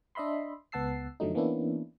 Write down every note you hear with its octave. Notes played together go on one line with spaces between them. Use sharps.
D4 D#5 E5 B5 C6
C#2 B3 F#5 A5 E6 C7
F#2 D3 F3 F#3 A3 D#4
E3 A#3 B3 C#4 D4 E4